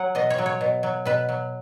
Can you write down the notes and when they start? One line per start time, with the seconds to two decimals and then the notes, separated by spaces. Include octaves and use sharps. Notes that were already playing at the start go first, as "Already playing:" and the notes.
Already playing: F#3 C#5 F#5
0.15 B2 D#5
0.30 C#5
0.38 F#3
0.46 C#5
0.61 B2
0.83 F#3
1.05 B2 B4
1.29 F#3